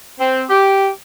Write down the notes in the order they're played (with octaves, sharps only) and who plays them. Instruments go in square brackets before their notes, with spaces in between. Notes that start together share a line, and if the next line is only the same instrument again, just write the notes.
[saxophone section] C4
G4